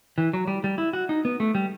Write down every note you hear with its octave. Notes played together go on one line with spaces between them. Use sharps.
E3
F#3
G3
G3
E4
F#4
D#4
B3
A3
G3